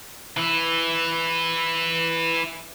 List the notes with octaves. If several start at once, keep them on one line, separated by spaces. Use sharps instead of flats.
E3 E4